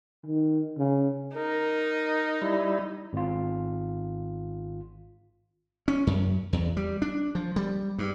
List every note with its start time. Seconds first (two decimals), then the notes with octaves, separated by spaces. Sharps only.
0.24 D#3
0.78 C#3
1.36 D#4 A#4
2.42 G3 E4
3.13 G#1 F4
5.88 C#4
6.07 F#2
6.53 E2
6.77 G3
7.02 D4
7.35 F3
7.56 G3
7.98 G2